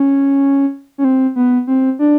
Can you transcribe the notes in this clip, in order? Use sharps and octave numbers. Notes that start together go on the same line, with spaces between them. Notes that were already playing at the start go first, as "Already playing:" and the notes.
Already playing: C#4
C#4
C4
B3
C4
D4